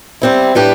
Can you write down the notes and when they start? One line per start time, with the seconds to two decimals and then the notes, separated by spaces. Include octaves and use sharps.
0.22 G3 C4 E4
0.55 A2 G3 D4 G4 B4